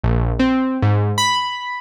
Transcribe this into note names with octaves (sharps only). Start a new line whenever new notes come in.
A#1
C4
G#2
B5